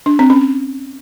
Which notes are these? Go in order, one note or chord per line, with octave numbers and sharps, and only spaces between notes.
D4
C4
C#4